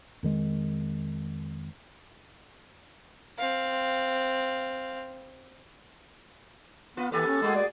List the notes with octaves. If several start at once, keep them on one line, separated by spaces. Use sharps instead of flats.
F2 D#3 G#3
C4 F5
B3 F4 B4
E3 A#3 G4 A4 B4
C#4
G#3 A3 F#4 G#4
D5